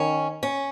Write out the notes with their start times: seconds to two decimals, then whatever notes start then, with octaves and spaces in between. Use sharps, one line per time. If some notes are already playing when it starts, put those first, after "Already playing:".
Already playing: D#3 C#4
0.43 C#4